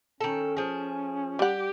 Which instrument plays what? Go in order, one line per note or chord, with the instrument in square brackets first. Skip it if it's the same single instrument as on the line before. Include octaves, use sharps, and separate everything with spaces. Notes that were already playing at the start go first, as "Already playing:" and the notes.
[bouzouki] D#3 A4 [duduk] C#4
[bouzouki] F3 G#4
[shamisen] G3 F#5 [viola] G4